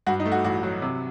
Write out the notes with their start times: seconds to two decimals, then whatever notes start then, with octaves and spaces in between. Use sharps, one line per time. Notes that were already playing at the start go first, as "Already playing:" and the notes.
0.06 G2 F#4
0.20 D#4
0.25 A3
0.32 F#4
0.44 A1 F#4
0.63 F#3
0.82 C3